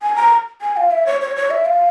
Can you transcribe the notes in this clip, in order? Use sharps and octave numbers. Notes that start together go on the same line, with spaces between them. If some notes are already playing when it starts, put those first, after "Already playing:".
G#5
A#5
G#5
F5
E5
C#5
C#5
C#5
E5
F5